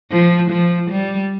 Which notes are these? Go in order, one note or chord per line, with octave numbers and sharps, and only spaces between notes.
F3
F3
G3